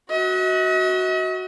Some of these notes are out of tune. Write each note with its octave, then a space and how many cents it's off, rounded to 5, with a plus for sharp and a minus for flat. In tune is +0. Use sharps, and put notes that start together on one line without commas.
F#4 +0 D#5 +45